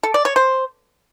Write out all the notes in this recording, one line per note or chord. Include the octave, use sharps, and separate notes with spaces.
A4
D5
C#5
C5